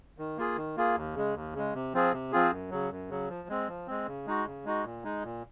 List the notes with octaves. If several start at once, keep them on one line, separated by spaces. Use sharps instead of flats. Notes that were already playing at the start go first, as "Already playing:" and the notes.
D#3
A#3 F4 G#4
D#3
A#3 F4 G#4
D#2
C#3 G#3
D#2
C#3 G#3
C3
F3 C4 F4 G#4
C3
F3 C4 F4 G#4
F#2
C#3 F#3
F#2
C#3 F#3
F3
G#3 C4
F3
G#3 C4
C#3
G#3 D#4 F#4
C#3
G#3 D#4 F#4
A#2
G#3 D#4
A#2